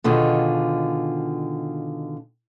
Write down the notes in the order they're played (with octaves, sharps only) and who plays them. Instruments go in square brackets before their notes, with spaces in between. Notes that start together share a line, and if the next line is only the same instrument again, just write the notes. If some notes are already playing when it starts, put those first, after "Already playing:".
[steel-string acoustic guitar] B2 D3 D#3 F4 G#4